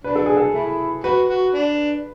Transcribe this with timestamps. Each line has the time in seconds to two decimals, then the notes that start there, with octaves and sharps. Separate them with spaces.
0.04 D4 B4
0.15 A4
0.26 G#4
0.37 A4
0.54 A3 E4
1.04 F#4 B4
1.30 F#4
1.55 D4